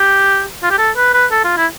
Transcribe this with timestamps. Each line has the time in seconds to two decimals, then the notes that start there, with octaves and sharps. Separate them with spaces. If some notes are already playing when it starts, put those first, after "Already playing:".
Already playing: G4
0.63 F4
0.71 G4
0.78 A4
0.97 B4
1.14 B4
1.31 A4
1.44 F4
1.57 E4